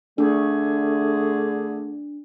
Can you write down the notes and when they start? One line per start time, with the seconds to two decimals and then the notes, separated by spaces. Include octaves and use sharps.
0.18 D3 A3 D4 G#4